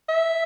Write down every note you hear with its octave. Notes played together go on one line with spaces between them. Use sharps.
E5